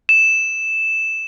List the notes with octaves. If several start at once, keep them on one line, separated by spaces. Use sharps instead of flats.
E7